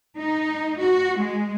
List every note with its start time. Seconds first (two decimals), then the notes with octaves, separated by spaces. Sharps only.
0.17 D#4
0.81 F#4
1.20 G#3